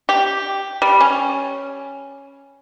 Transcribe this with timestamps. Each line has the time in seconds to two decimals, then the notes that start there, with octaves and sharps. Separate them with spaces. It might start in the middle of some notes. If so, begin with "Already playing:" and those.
0.09 G4
0.82 G3
1.00 C#4